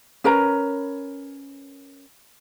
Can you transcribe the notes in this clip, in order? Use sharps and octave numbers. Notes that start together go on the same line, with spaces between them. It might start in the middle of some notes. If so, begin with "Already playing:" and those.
C#4 A#4 B4 A#5